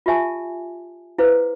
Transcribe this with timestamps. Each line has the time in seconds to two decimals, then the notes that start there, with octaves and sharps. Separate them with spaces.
0.06 F4 G4 E5 G#5 A5
1.18 E4 G#4 B4 C5 F5